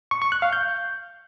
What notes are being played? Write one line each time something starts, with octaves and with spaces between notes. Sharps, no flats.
C#6
C#6
F#6
F5
G6